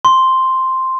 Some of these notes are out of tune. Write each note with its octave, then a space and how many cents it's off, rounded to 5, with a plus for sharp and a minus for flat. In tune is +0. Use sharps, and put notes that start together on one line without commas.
C6 +0